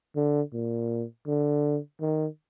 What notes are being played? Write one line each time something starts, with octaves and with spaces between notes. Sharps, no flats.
D3
A#2
D3
D#3